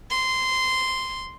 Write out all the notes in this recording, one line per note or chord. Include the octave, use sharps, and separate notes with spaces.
C6